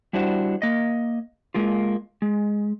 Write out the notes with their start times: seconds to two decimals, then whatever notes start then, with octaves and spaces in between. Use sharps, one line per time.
0.13 G3 D4 E4 F#4 C5
0.62 A#3 D#5
1.54 G#3 A#3 F4
2.22 G#3